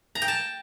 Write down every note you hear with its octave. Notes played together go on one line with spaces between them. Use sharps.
A#5
G5
A5